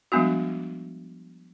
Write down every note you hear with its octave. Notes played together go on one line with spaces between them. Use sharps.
F3 G3 G#3 B3 D4 F#4